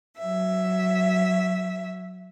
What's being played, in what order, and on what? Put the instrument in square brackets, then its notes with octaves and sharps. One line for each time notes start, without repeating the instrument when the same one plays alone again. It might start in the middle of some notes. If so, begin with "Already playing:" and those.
[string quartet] F#3 E5